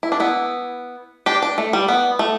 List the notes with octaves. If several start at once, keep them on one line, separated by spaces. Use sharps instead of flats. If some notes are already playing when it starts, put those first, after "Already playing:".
E4
D4
B3 E4
D4 G4
D4
A3
G3
B3
A3